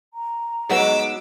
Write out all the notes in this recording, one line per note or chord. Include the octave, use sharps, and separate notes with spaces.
A#5
F#3 G#3 B3 D#4 F#4 D6 E6